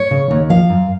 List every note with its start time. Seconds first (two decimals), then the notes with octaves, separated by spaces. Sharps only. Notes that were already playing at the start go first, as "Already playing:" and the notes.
Already playing: C#5
0.11 C#3
0.31 D#2
0.49 F3 F5
0.69 F#2